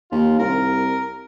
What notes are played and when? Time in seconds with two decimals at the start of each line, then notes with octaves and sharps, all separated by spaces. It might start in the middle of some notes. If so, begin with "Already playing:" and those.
0.12 D#2 F4
0.39 C2 A#4